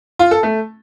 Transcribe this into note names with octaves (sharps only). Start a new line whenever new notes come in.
F4
A4
A3